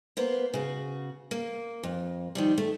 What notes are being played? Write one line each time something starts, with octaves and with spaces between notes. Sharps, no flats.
A#3 B3 C5
C#3 F#4
A#3
F2
D#3 F3 G3
A3